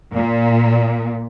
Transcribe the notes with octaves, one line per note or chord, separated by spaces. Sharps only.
A#2